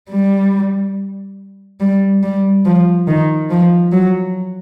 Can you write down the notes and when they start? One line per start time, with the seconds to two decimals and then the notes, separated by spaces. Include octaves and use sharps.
0.10 G3
1.80 G3
2.23 G3
2.65 F3
3.08 D#3
3.50 F3
3.93 F#3